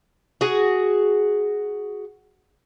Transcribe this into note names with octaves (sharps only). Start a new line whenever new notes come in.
F#4 G#4